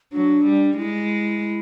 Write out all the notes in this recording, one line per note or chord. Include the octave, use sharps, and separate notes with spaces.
F#3 D4
G3
D#4
G#3 E4